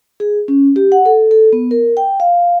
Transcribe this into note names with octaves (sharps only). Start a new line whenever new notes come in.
G#4
C#4
G4
F#5
A4
A4
B3
A#4
G5
F5